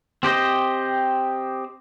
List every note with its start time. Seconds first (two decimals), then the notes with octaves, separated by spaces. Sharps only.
0.23 C4 G4 C5 D#5